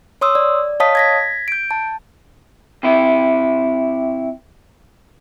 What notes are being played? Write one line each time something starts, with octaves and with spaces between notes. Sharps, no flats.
C#5 C6 D#6 E6
D5
C#5 D#5 F5 A5 D#6 B6
G#6 A#6 B6
G6 D7
A5
C3 E4